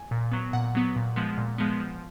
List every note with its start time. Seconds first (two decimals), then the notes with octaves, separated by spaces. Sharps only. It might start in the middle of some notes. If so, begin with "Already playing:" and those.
Already playing: G#5
0.11 A#2
0.32 F#3 B3
0.53 A#2 F#5
0.75 F#3 B3
0.96 A#2
1.16 F3 G#3 B3
1.38 A#2
1.58 F3 G#3 B3
1.80 F3